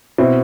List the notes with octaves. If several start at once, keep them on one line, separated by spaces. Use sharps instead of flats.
B2 C4 E4